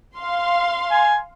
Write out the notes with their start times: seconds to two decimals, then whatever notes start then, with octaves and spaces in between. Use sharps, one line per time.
0.16 F5 C6
0.91 G#5